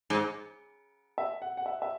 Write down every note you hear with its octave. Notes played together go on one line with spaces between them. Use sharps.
G#2
E5
F#5
F#5
E5
E5